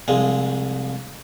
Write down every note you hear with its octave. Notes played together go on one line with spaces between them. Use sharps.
C2 F3 G#3